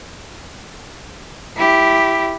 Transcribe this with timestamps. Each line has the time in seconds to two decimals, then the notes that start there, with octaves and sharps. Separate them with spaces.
1.56 E4 G4